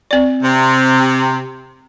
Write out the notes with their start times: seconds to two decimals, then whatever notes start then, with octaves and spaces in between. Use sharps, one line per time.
0.11 C4 D5
0.42 C3